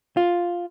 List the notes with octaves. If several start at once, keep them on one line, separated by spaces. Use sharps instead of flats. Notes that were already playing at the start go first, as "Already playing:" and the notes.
F4